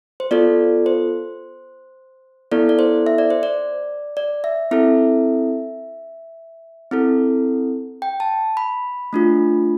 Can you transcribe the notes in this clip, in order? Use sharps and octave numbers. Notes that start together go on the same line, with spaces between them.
C5
B3 F4 A4 D5
C5
B3 E4 A4 D5
D5
C5
E5
D5
C5
D5
D5
E5
C4 E4 A4 E5
C4 E4 A4
G5
A5
B5
A3 D4 F4